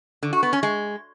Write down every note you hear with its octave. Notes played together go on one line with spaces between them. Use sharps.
D3
F#4
B3
C#4
G#3